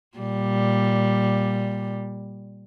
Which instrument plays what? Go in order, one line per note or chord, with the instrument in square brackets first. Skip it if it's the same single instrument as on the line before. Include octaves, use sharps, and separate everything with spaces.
[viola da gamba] A#2 G3